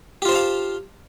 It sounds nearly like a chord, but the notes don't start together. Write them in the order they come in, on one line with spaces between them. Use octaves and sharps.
G4 F4 C5 A5 F5